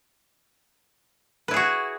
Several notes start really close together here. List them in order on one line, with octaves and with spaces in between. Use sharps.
B4 E4 G#4 F#4